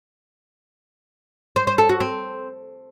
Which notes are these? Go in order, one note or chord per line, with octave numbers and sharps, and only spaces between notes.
C5
C5
A4
F#4
C4